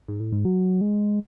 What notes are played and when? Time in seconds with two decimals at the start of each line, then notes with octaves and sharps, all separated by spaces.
0.08 G#2
0.20 A2
0.32 G#2
0.45 F#3
0.81 G#3